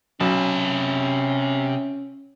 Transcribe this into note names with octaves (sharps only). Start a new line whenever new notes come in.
B1 C3 C#4 A5